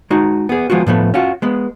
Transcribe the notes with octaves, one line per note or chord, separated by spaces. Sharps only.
G#3 D#4 F#4
B3 G#4
F3 G#3 B3 F4 F#4
A2 F3 A3 B3
C#4 F4 F#4
G#3 B3